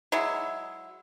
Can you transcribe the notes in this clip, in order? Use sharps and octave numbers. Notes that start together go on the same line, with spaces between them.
F#3 G#3 E4